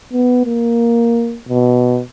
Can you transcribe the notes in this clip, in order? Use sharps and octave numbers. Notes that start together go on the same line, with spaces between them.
B3
A#3
B2